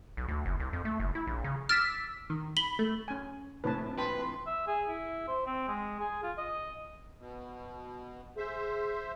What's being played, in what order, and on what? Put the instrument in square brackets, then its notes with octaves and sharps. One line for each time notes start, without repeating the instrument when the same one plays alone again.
[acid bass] B1
D2
F#1
C2
F2
A3
F#1
E4
A#1
C#3
[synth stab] D6 E6 B6 [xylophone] F6 A6
[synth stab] D#3
[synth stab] B5 [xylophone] F#7 G7
[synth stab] A3
[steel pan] C#4 G#5
[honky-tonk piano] A#1 F2 A2 [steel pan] B4 C#5 A5
[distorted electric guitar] B4 [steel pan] G5 A5 [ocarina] C6
[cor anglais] E5
G#4
E4
C5
C4
G#3
G#4
F4
D#5
[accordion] B2
[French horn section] G#4 [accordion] C5 E5